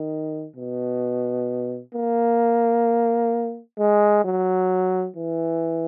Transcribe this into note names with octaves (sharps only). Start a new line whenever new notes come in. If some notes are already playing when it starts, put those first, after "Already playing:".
Already playing: D#3
B2
A#3
G#3
F#3
E3